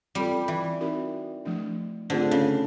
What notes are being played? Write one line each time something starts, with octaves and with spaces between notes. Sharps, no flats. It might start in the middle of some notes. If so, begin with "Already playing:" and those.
G3 C4 F4 A4
E3
C4 D#4 F#4 A#4
F3 A3 D4
D3 A3 C4 F4 G#4 C5
C#3